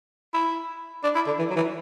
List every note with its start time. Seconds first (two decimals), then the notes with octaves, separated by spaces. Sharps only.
0.34 E4
1.04 D4
1.15 E4
1.27 D3
1.39 E3
1.50 F#3
1.56 E3